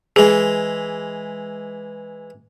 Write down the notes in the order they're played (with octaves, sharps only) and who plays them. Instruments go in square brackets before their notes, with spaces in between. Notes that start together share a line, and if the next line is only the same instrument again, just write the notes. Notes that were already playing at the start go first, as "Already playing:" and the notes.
[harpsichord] E3 G#3 [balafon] G#4